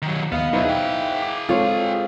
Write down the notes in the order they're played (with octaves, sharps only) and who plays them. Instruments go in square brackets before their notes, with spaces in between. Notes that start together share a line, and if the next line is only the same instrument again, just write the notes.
[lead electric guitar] D#3 F#3
[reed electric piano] D#2 [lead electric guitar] B3 [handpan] D#5 [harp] F5
[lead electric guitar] B2 F#3 [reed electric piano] D#4 C5 E5 [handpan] E4 B4
[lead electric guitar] G#4 G5
[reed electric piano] D6
[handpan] G#3 C4 A4 [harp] F4 [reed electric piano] C5 C#5 F6